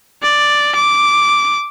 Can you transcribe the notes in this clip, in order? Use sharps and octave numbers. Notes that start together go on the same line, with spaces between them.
D5
D6